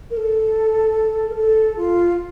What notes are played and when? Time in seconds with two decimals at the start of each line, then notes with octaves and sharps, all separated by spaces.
0.10 A#4
0.17 A4
1.30 A#4
1.36 A4
1.77 F4